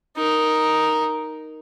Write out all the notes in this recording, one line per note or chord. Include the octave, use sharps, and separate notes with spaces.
D#4 A#4